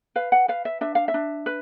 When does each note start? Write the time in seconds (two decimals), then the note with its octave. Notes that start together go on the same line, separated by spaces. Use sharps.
0.16 B4 F5
0.32 F#5
0.48 B4 F5
0.65 E5
0.81 D4 E5
0.95 F5
1.08 E5
1.14 D4
1.46 B4